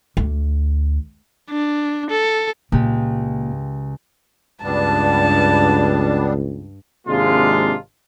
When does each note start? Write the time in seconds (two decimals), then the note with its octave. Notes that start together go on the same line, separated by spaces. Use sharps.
0.17 D2
1.50 D4
2.10 A4
2.72 C#2 A#2 G4
4.64 C#2 G2 G3 B3 D4 A5
7.07 G#1 C3 G#3 A#3 D4 F4